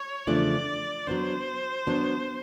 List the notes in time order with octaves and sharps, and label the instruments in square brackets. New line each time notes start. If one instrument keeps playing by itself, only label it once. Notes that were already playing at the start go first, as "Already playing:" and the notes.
Already playing: [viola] C#5
[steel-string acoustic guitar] E2 C#3 F3 A3 D4 [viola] D5
[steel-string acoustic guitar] F#3 B3 D4 [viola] C5
[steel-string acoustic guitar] F#3 B3 D4